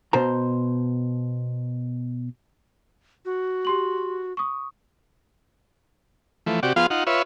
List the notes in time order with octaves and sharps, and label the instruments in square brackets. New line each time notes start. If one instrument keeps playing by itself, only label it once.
[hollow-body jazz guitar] B2 C5 A#5
[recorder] F#4
[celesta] G4 C6 F#7
C#6 D#6
[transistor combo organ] E3 F3 A3
C3 F#4 G4 D5
F3 B3 F4 G#4 F5 C6
D#4 F4 F#5
F4 B4 C#5 E5